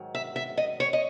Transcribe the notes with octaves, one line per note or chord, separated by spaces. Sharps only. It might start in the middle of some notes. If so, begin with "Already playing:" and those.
Already playing: G#2 D#3 F#3
E5
E5
D#5
C#5
D#5